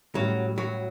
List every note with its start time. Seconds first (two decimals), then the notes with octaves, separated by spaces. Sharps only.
0.15 A2 F#3 G3 C#4
0.58 F#3